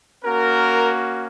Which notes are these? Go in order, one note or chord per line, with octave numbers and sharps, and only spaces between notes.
A#3 C#4 F#4 A#4